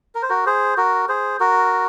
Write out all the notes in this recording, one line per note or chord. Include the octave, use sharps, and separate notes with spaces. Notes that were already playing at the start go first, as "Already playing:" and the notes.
A#4
C5
F#4 A#4
G#4 C5
F#4 A#4
G#4 C5
F#4 A#4